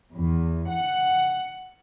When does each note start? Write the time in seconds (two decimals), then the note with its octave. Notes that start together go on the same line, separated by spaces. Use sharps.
0.16 E2
0.71 F#5